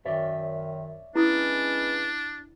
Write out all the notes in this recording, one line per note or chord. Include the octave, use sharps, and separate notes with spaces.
F#2 D#3 C#5 D5 E5
G#3 B3 C#4 D4 E4 D#6